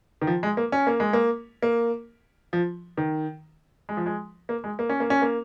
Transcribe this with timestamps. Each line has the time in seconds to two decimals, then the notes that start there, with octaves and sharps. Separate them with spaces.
0.22 D#3
0.27 F3
0.43 G#3
0.57 A#3
0.72 C#4
0.87 A#3
1.00 G#3
1.13 A#3
1.62 A#3
2.53 F3
2.97 D#3
3.89 G#3
3.97 F3
4.06 G#3
4.49 A#3
4.64 G#3
4.79 A#3
4.89 C#4
5.00 A#3
5.10 C#4
5.22 A#3